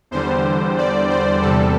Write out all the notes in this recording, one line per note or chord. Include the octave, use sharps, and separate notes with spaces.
E2 D3 G3 C5
D5
C5
E2 C3 G3 A4